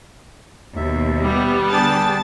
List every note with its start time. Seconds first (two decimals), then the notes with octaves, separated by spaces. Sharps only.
0.76 D#2 B2 E5
1.23 G3 B3
1.71 D3 D4 G#4 G5 A5 A6